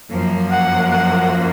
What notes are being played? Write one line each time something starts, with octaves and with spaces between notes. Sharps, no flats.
F#2 F3 A#3
F#5
F#5